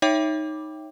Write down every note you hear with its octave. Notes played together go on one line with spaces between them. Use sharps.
D#4 C#5 E5 G5 D6